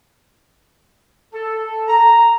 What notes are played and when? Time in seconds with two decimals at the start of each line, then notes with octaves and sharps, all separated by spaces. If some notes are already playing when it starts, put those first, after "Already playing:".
1.33 A4
1.88 A#5